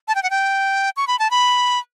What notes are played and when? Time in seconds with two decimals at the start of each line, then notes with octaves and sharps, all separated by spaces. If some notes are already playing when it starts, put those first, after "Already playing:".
0.08 A5
0.15 G5
0.23 F#5
0.30 G5
0.97 C#6
1.07 B5
1.19 A5
1.31 B5